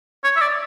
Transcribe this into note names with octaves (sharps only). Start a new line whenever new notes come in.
C#5
E5
D5